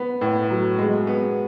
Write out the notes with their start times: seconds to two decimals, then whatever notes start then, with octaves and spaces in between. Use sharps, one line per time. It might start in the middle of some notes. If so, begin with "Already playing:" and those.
Already playing: B3
0.21 A2
0.50 F#3
0.78 G#3
1.07 B3